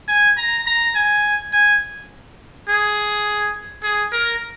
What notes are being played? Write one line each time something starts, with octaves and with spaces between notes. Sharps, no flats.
G#5
A#5
A#5
G#5
G#5
G#4
G#4
A#4